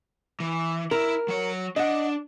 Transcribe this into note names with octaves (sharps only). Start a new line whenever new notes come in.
E3
E4 A#4
F#3 C#5
D4 D#5 F#5